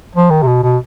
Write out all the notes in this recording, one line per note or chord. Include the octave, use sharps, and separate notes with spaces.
F3
D#3
C3
B2
B2